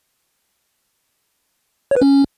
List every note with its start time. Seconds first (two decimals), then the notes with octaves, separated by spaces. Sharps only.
1.91 C#5
1.96 B4
2.02 C#4